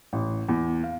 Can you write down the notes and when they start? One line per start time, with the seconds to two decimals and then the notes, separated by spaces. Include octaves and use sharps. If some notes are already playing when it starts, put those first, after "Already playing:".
0.13 A1
0.49 E2
0.84 F5